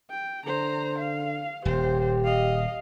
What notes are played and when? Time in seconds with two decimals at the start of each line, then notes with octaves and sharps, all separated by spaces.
0.10 G5
0.46 D3 C5 A#5
0.99 F5
1.65 D#1 G4 C5
2.24 D#5 F5